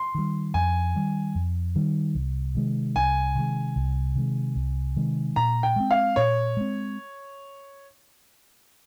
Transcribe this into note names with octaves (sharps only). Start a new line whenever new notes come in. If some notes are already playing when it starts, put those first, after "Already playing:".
Already playing: C6
D#3 G3
F2 G#5
D#3 G3
F2
D#3 G3
C2
C3 D#3 G#3
C2 G#5
C3 D#3 G#3
C2
C3 D#3 G#3
C2
C3 D#3 G#3
A#2 A#5
G5
G#3 C4
F5
A#2 C#5
G#3 C4